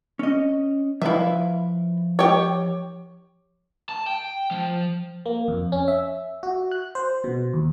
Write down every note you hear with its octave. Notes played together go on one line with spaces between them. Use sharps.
C#4 D#5
F3 E4 B4 E5 F5
G4 C#5
A5
G5
F3
A#3
F2
C#4
E5
F#4
F#6
C5
B2
D#2